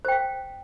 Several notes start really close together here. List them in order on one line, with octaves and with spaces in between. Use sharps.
C5 G5 F5